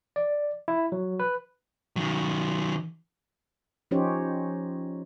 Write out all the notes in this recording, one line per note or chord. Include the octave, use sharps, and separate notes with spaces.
D5
E4
F#3
B4
D#3 F#3
F3 C#4 D#4 G4 C5 C#5